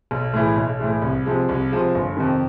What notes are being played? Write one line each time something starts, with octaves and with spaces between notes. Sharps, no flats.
B1
A2 E3 G#3
B1
A2 E3 G#3
C2
C3 F3 G#3
C2
C3 F3 G#3
G1
F2 C3 D#3